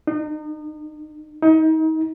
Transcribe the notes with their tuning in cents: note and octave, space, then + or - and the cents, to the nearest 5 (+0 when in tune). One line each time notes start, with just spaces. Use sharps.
D#4 -35
D#4 +30